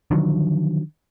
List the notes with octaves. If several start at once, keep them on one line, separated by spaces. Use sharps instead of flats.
D3 D#3 F3 F#3